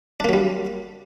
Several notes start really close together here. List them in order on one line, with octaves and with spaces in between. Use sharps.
D4 A#3 F#3 G3